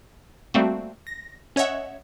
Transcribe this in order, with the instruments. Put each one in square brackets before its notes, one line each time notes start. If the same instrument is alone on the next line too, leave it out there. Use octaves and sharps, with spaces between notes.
[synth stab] G3 A3 A#3 C4 F#4
A#6
C#4 C#5 D#5 E5 F#5